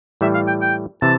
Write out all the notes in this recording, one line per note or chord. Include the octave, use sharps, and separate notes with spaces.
A2 E3 G3 E5
F5
G5
G5
C3 E3 A5